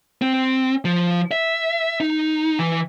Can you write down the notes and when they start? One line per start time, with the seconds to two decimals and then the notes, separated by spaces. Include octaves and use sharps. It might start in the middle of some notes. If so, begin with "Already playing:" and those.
0.22 C4
0.85 F3
1.31 E5
2.00 D#4
2.59 E3